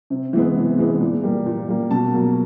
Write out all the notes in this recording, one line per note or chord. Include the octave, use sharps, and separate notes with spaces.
C3
E3 G#3 B3
C3
E3 G#3 B3
A#2
G3 A#3
A#2
G3 A#3
B2 A5
F#3 A#3